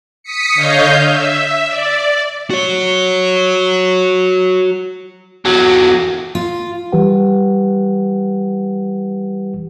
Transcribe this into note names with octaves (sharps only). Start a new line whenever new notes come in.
D#6 B6 C#7
D3 C#5 D#5 F5 G6
E5
D5
F#4 C#5
E2 F#3
F4
E3 G3 G4 B4 F#5